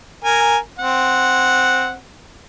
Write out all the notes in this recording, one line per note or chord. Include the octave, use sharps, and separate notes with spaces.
A#4 G#5
C4 F#5